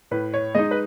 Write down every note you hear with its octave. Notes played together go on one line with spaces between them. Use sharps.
A2 B4
C#5
G#3 D#4 D#5
B4